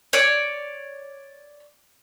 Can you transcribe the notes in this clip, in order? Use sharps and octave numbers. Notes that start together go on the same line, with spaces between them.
C#5 D5